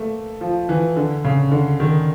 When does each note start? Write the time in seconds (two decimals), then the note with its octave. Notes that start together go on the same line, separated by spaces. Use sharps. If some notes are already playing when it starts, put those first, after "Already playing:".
Already playing: A3 A#3
0.41 F3
0.69 E3
0.96 D3
1.24 C#3
1.51 D3
1.80 D#3